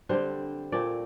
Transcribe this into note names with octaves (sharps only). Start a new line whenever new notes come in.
D3 G3 C4 C5
A#2 A3 C4 D5